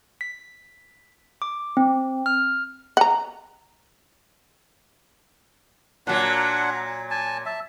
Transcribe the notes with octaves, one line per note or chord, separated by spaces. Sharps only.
B6
D6
C4
F6
F#5 A#5
A#2 F#3 D4 F#5
G#5 A5
E5 A5